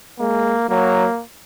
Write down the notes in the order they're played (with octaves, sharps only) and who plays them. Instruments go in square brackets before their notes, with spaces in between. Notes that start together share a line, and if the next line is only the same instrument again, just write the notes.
[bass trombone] G#3 [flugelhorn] A#3
[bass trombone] F#3 [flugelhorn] A#3